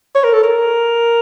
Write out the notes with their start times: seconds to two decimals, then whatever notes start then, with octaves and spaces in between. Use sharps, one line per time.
0.15 C#5
0.24 A#4
0.33 A4
0.43 A#4